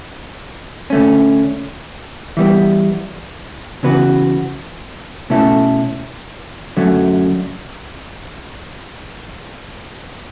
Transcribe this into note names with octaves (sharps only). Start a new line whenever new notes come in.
D3 A3 C#4
E3 G3 B3
C#3 E3 B3 F#4 B4
B2 A3 C#4 E4 A4
F#2 D3 F#3 A3 C#4